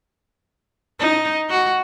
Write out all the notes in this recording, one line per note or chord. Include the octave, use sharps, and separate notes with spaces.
D#4
F#4